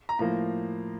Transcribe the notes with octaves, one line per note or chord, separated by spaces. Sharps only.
A#5
A2 F3 A#3 A#5